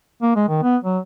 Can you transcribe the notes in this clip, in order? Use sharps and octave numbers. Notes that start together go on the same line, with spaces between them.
A#3
G#3
D#3
B3
F#3